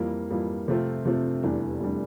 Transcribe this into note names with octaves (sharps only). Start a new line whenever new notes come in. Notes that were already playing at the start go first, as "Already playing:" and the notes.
Already playing: F2 E3 G3 A#3
F2 E3 G3 A#3
C3 F3 A3 C4 F4
C3 F3 A3 C4 F4
F1 E2 E3 G3 D4
F1 E3 G3 D4